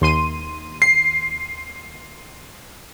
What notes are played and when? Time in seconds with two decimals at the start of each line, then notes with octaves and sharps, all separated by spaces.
0.01 D#2 C6 D#7
0.82 C7